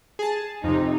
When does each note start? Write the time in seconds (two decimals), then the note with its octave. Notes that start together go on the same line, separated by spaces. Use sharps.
0.19 G#4 A5
0.64 F2 C3 D#4